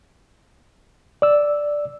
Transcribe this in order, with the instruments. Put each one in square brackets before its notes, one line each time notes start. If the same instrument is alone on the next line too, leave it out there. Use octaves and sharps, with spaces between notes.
[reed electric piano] D5 E6